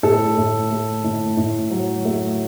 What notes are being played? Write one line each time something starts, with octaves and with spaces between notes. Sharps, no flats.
A2 A4
A2
A3
A2
A2
F#3
A3